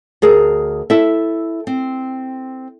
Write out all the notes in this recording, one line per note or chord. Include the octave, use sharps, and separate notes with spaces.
D2 G#4 A#4
E4 A4 E5
C4